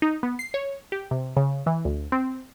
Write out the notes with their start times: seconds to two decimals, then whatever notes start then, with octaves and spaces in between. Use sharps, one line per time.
0.02 D#4
0.23 B3
0.39 C7
0.54 C#5
0.92 G4
1.11 C3
1.37 C#3
1.66 E3
1.85 D2
2.12 C4